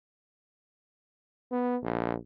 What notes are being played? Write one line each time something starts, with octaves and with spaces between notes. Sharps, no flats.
B3
A#1